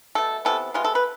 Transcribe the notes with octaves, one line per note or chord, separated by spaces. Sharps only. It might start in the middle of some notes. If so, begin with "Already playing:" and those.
B2 A3 A4
C3 E3 B3 A4
C3 G#3 B3 F4
A4
B4